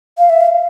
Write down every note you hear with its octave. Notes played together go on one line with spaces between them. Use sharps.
F5
E5
F5